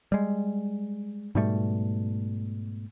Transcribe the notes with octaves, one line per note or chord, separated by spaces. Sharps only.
G3 G#3
G#2 B2 G3 A3